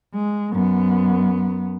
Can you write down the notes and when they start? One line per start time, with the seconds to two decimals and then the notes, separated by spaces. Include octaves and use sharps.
0.14 G#3
0.52 F#2 B3